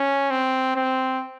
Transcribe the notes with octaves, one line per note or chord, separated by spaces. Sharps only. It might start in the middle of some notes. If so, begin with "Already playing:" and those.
Already playing: C#4
C4
C4